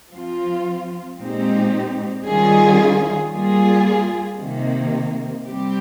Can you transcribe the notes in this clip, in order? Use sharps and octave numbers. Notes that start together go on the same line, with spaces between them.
F3 C4 F4
A#2 G#3 C4 D#4 G4
D#3 G3 C#4 F4 G#4
G3 A#3 F4 G#4
C3 D#3 A#3
G3 C4 G4